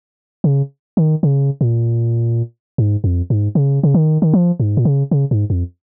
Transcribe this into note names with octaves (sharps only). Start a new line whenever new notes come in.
C#3
D#3
C#3
A#2
G#2
F2
G#2
C#3
C#3
D#3
D#3
F3
G#2
A#2
C#3
C#3
G#2
F2